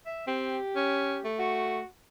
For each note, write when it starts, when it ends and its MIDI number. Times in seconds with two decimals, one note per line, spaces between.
0.06 0.24 76
0.27 0.58 60
0.27 1.26 67
0.76 1.19 61
1.24 1.80 57
1.39 1.86 66